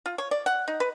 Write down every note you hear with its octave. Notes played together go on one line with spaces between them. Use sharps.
F4
C#5
D5
F#5
D#4
B4